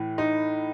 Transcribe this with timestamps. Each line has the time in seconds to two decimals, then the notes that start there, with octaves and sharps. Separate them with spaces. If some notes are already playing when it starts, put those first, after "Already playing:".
Already playing: A2 E3
0.18 D#4